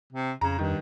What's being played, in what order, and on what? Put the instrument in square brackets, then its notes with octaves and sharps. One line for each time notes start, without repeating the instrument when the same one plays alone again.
[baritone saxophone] C3
[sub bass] F2 [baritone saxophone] C#3 [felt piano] A#5
[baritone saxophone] G2 [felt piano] D#3